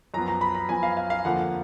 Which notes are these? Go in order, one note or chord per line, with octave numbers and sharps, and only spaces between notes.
F#2 F3 B3 A#5
A#5
B5
A#5
F#2 F3 B3 G#5
F5
F5
F5
F2 D3 F3 A#3 F#5